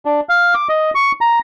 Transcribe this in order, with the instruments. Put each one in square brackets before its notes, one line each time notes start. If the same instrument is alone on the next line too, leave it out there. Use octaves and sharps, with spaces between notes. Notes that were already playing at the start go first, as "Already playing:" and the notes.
[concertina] D4
F5
D6
D#5
C#6
A#5